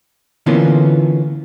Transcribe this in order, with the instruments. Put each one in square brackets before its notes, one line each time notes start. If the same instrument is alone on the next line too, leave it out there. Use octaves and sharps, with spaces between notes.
[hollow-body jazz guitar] D3 E3 A#3 B3 C#4 F4